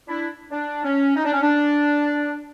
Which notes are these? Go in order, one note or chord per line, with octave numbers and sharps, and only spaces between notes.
D4 E4
D4
C#4
D#4
D4
C#4
D4